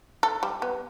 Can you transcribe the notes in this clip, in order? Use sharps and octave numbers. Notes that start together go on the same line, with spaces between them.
A4
G3
B3